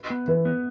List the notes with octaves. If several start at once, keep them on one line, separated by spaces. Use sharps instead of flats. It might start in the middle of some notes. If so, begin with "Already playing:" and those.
Already playing: B4
B3
E3 B4
B3